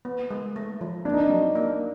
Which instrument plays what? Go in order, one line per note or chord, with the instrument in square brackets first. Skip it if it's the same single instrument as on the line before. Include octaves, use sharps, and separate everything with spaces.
[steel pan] B3
G#3
A3
F3
[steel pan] A#3 [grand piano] D4
[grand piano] D#4
D4
[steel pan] F#3
A#3